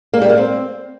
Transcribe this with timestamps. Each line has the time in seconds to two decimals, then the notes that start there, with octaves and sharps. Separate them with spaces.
0.13 A#3
0.22 G3
0.30 A#3
0.38 C4